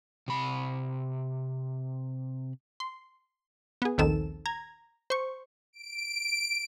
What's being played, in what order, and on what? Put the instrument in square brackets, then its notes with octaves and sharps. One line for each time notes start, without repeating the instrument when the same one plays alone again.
[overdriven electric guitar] C3 B5
[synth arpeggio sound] C6
B3 G#4
A#1 D#2 D#3 C4 A4 E7
A#5 G#6
C5 C#6
[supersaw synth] D7